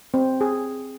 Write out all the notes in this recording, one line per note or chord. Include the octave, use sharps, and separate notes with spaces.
C4
G#4